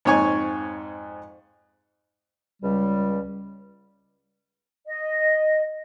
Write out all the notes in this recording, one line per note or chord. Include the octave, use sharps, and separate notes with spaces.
F2 G#2 C#5 G#5 C#6
C#2 G3
D#5